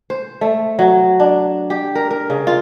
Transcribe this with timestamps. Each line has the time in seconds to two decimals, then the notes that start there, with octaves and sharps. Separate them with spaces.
0.10 C5
0.41 A3
0.79 F#3
1.20 D4
1.70 G4
1.95 A#4
2.11 A#4
2.30 C#3
2.47 F4